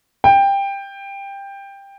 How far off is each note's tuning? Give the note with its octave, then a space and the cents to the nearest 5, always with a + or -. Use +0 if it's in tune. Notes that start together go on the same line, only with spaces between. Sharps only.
G5 +15